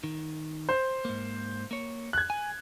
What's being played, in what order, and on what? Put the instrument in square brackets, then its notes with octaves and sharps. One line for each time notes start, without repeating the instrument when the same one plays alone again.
[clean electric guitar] D#3
[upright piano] C5
[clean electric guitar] G#2 A#3
A#3 C#5
[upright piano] F#6 G#6
[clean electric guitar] G#5